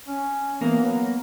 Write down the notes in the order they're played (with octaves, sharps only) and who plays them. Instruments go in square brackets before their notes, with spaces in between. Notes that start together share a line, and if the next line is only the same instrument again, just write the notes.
[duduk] C#4
[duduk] E3 [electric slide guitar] A#3 A#4 [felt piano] B3
[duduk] F#3